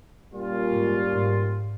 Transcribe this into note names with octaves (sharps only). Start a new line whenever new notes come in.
A#2 G3 C#4 F4
G#2
G#2